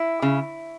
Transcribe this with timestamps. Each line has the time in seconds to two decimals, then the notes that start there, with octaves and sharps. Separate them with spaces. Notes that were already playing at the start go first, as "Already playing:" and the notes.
Already playing: E4
0.22 C#3